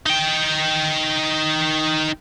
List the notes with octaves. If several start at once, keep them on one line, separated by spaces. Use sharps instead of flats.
D#4 G5